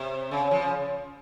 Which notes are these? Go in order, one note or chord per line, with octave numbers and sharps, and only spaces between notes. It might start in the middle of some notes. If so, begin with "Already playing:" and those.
Already playing: C3
C#3
C#3 F3